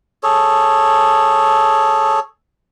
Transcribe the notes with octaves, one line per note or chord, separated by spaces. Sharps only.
G#4 A4 C#5